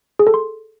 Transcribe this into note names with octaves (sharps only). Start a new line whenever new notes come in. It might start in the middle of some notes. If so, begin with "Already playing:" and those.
G#4
A4
C6